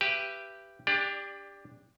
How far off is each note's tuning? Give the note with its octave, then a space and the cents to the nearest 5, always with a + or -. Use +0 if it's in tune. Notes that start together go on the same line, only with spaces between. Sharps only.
G4 +0 B4 +10 E5 +35
D4 +0 G4 +25 D5 +20